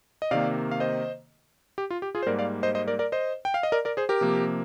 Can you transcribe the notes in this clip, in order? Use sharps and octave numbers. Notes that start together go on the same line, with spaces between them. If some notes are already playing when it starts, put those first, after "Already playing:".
D#5
C3 D#3 A#3 D5 F5
F5
C5 D#5
G4
F4
G4
F4 G#4
C5
G#2 G3 A#3 A#4 D5
D5 F5
C5 D#5
C5 D#5
A#4 D5
A#4 D5
C5 D#5
G5
F5
D#5
A#4 D5
A#4 D5
G#4 C5
G4 A#4
C3 F3 A#3